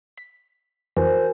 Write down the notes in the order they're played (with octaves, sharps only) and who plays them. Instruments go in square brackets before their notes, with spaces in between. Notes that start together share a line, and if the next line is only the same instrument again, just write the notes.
[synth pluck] B6
[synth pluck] F2 E3 [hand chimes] F#4 A#4 G#5 [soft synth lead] C5